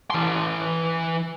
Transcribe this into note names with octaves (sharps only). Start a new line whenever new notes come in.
E3 C6